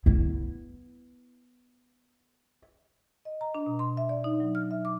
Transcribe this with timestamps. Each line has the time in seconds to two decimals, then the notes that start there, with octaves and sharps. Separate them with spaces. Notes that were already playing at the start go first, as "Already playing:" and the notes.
0.06 B3 E4
3.25 D#5
3.41 A#5
3.55 D4
3.66 B2
3.79 C6
3.97 E5
4.09 D5
4.24 D#4
4.40 F#3
4.55 F6
4.71 E5
4.85 D6